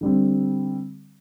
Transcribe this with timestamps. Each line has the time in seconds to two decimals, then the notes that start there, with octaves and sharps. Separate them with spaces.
0.01 D3 G3 C4